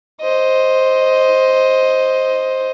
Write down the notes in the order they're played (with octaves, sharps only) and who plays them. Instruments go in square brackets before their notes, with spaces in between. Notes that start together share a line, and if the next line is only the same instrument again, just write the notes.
[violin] C5 D#5